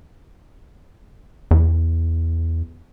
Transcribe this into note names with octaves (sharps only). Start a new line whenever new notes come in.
E2